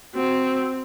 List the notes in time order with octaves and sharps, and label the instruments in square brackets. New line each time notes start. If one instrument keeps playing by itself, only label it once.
[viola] C4 [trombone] F#4